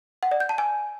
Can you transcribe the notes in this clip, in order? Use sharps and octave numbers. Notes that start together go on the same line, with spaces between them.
F#5
D5
G6
A5
G#5